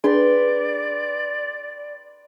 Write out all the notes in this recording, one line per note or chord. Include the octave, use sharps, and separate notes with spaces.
D4 G#4 B4 D5 G5 C6